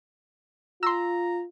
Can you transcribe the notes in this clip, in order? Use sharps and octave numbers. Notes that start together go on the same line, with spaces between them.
F4 A#5 C6 E6